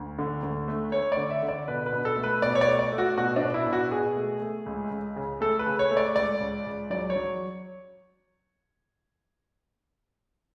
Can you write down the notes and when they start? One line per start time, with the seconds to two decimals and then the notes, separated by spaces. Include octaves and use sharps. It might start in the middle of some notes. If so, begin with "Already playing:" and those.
Already playing: D2
0.19 D3
0.43 D2
0.68 A3
0.92 A3 C#5
1.12 D5
1.17 D3
1.30 E5
1.43 D3
1.49 D5
1.68 B2 B4
1.86 B4
1.93 B2
2.05 A4
2.17 A3
2.24 B4
2.42 B2 D5
2.55 C#5
2.61 D5
2.68 A3
2.79 D5
2.93 A3
2.98 F#4
3.17 B2 F#4
3.36 D4
3.42 B2
3.54 E4
3.67 B2
3.73 F#4
3.91 B2 G#4
4.16 A3
4.42 A3
4.66 C#2
4.91 C#2
5.16 C#3
5.41 A3 A4
5.59 B4
5.66 C#3
5.79 C#5
5.91 A3
5.97 D5
6.15 C#2 D5
6.41 C#2
6.66 C#2
6.90 F#3 D5
7.10 C#5
7.16 F#3